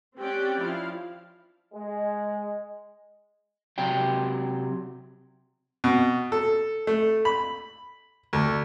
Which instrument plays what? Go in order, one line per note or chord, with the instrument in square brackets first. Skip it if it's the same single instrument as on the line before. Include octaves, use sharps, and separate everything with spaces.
[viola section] C4 C#4 G4 D5 F#5 G5
F3 E4 F5
[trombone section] G#3
[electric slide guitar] C3 F#3 G5
[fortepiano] B2
A4
A3
B5
D2